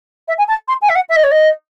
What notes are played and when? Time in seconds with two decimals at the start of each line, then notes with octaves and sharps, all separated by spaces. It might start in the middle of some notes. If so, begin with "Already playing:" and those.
0.28 E5
0.38 G#5
0.48 A5
0.68 C6
0.82 G#5
0.89 E5
0.95 F#5
1.09 E5
1.16 D#5
1.23 C#5
1.31 D#5